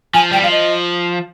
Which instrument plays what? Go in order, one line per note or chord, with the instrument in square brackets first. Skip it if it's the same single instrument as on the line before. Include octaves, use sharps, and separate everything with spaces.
[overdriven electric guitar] F3 [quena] G#5
[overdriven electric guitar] G3 [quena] G5
[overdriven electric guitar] F3 [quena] F5
[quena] D#5